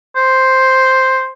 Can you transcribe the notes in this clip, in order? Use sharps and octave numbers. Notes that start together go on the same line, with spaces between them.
C5